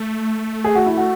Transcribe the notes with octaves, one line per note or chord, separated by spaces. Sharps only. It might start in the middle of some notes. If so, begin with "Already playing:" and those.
Already playing: A3
G#4
F#4
E4
F#4